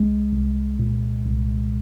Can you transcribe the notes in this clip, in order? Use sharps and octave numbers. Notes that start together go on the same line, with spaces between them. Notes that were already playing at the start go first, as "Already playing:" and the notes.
Already playing: C2 G#3
C2
A#2
C2